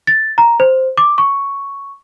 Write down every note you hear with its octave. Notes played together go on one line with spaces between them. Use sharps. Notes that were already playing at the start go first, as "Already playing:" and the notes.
A6
A#5
C5
D6
C#6